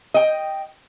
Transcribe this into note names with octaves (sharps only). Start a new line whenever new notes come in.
D#5 G5